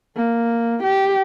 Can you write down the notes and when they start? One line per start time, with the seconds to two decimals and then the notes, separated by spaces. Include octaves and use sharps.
0.16 A#3
0.83 G4